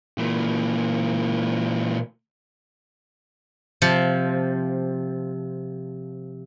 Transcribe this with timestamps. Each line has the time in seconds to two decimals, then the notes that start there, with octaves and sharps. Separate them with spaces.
0.18 A#2 E3
3.82 C3 F3